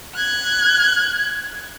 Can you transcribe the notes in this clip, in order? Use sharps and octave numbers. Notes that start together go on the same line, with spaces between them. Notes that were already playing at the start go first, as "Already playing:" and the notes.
F#6 G#6